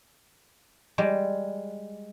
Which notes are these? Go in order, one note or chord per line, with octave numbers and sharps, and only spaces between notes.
G3 G#3